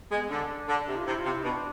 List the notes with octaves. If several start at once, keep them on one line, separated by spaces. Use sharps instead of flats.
G#3 B3
D3 D4
D3
C3
F4
C3 E4
F4
C3
E4
B2 D4